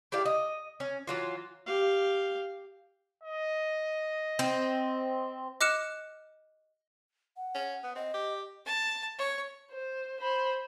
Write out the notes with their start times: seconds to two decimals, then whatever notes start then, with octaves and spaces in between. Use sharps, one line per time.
0.12 E4 G4 D5 F5
0.25 D#5
0.80 C#4
1.07 E3 F#3 F4
1.67 G4 F5
3.24 D#5
4.39 C4
5.61 D#5 D6 F6 F#6 C#7 E7
7.37 F#5
7.55 C#4
7.83 B3
7.96 C4 D#5
8.14 G4
8.66 A5
9.18 C#5
9.71 C5
10.20 C5 B5